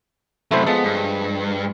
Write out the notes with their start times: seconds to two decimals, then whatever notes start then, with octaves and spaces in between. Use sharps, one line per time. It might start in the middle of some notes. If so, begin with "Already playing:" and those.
0.51 F#2 C3 A3 E4 C5
0.67 F3 G#3 B3 A4
0.84 G2